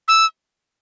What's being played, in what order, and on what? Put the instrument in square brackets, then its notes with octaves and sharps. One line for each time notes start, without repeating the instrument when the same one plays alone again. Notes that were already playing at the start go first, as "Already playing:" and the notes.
[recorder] E6